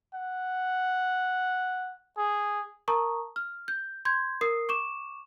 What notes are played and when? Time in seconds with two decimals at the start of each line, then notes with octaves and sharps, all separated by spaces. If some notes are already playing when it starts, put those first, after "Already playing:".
0.14 F#5
2.18 G#4
2.88 A#4 A5 A#5 C#6 D#6
3.36 F6
3.68 G6
4.05 C6 G6 G#6
4.41 A#4 D#6 C7
4.69 C#6 D6 E7